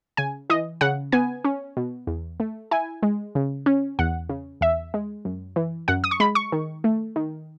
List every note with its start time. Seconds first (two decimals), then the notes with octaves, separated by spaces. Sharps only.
0.17 C#3 G#5
0.50 E3 D#5
0.81 C#3 F#5
1.12 B3 G#5
1.44 C#4
1.77 B2
2.07 E2
2.40 A3
2.71 E4 G#5
3.03 G#3
3.35 C#3
3.66 C#4
3.99 E2 F#5
4.29 C#3
4.61 E2 E5
4.94 G#3
5.25 F#2
5.56 E3
5.88 F#2 F#5
6.04 D#6
6.11 C#6
6.20 G#3 B5
6.35 C#6
6.52 D#3
6.84 A3
7.16 D#3